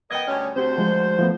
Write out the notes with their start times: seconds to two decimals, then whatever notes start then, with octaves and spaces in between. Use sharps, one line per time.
0.11 B3 A#4 D#5 G5 D#6 G#6
0.28 D2 G3 C#4
0.56 D2 C4 F#4 G4 C5 G6
0.78 F3 G#3
1.19 F3 A3 B3